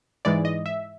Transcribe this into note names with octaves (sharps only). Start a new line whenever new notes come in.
G#2 E3 G#3 D5
D#5
E5